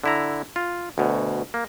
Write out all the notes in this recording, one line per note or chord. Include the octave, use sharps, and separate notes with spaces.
D3 E4 A#5
F4
D2 B2
A#3